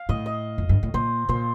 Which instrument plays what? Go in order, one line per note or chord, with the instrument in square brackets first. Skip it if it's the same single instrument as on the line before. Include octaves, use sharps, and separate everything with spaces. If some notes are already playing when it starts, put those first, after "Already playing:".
Already playing: [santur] F5
[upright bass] A2 [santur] D#5
[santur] D#5
[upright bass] F2
G2
A2
[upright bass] A#2 [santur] C5
[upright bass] A#2 [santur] C5